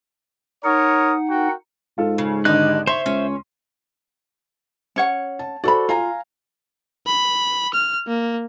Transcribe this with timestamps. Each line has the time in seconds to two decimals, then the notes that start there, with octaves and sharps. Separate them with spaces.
0.64 D#4 A#4 C#5 F#5 D#6
1.30 F#4 A#4 G5
1.98 G#2 F4 A4
2.18 C#3
2.45 G#1 D3 D4 D#4 G4 F#6
2.87 C5 C#5 E5 C6
3.06 C#2 C#4
4.96 C#4 C#5 F#5
5.39 A5
5.64 F#4 A4 C5 D5 B5
5.89 F4 F5 G#5 A#5
7.07 B5
7.74 F6
8.08 A#3